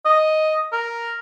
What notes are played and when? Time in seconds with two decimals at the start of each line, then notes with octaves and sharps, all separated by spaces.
0.05 D#5
0.73 A#4